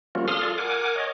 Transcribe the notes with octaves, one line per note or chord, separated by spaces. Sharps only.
F3 G3 A#3 C#4 F4 F#4
G#4 A4 F5 C6 D#6 F6
F4 A4 D5 F5
A#4 F#5 G#5 D6
C#5 D#5